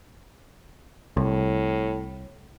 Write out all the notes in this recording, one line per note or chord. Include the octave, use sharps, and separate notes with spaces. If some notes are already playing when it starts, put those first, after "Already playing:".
C2 A2